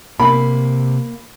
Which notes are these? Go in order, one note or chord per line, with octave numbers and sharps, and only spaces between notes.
C3 A#3 B5